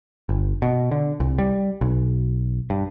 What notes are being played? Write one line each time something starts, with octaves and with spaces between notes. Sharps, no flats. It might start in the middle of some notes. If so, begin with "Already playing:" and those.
G1
B2
D3
C2
G3
B1
G2